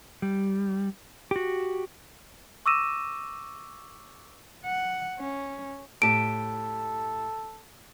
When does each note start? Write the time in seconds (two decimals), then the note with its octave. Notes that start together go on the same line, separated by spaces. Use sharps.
0.22 G3
1.31 F#4 G4
2.66 C#6 D6 E6 A#6 D#7 E7
4.65 F#5
5.19 C#4
6.02 A2 G4 A4 A5 D7